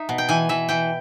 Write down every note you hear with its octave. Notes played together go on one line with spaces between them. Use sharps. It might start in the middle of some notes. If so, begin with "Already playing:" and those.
Already playing: D#4 E5
B2
G5
E3 G#5
E3 E5
E3 G5